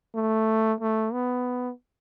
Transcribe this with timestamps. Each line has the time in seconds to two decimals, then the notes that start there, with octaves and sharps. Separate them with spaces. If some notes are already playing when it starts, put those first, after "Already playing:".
0.15 A3
0.81 A3
1.13 B3